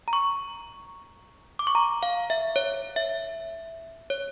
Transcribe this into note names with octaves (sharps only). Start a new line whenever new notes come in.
A#5
C#6
D6
C#6
A#5
F5
E5
C#5
E5
C#5